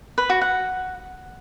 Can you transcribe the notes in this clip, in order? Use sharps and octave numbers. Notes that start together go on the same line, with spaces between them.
B4
F#4
F#5